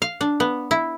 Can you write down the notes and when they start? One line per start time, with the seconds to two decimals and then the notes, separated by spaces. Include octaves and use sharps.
0.02 F5
0.21 D4
0.40 B3
0.71 E4